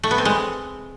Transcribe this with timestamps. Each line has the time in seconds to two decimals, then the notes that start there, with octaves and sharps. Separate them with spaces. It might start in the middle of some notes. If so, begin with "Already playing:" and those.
0.04 A3
0.11 B3
0.18 C4
0.25 G#3